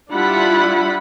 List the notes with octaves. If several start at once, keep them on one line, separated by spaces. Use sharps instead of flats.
G3 D4 E4 F4 F#5 B5